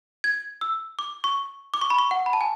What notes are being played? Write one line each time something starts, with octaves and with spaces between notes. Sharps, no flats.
G#6
E6
D6
C#6
D6
C#6
B5
C#6
F#5
B5
A5
G#5